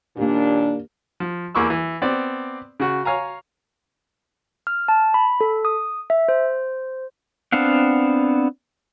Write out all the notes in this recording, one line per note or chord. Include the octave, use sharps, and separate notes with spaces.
D#2 A#2 A#3 D4 G4
F3
E2 A#3 E4 C#6 D6 E6
E3
B3 C4 D5
C#3 F#4
C#5 F5 G#5 A#5
F6
A5
B5
A4
D#6
E5
C5
B3 C4 D4 F5 F#5